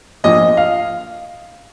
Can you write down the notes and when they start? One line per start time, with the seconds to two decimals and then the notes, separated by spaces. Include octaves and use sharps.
0.24 A#1 A#2 F3 D#5
0.57 F5